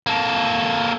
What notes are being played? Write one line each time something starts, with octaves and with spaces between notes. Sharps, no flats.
A#3 A4